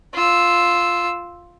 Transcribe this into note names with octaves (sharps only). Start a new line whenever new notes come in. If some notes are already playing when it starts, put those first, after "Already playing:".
F4 E6